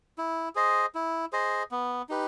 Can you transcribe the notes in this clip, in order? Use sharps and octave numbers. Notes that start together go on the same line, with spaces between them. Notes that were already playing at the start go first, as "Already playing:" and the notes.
E4
G#4 C5 D#5
E4
G#4 C5 D#5
B3
D#4 G4 B4